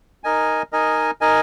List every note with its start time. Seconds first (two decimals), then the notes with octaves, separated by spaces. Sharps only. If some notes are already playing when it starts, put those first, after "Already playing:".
0.24 D#4 A#4 D#5 G#5
0.73 D#4 A#4 D#5 G#5
1.21 D#4 A#4 D#5 G#5